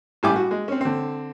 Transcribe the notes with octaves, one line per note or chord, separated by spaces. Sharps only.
A1 G3 E4 G5 G#5 D6
F#4
G#3
C4 C#4
D3 C4